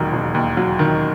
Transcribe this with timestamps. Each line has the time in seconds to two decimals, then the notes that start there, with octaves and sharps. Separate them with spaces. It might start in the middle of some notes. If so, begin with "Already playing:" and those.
Already playing: E1 D#2 D#3 F#3
0.13 E1
0.35 D#2
0.57 F#3
0.79 D#3